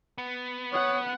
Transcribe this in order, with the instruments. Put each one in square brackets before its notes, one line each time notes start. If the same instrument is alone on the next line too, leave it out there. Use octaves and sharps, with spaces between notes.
[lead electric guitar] B3
[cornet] C#5 [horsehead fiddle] F#5 [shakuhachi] D#6